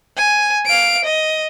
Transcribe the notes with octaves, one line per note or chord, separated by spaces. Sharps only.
G#5
F5 D7
D#5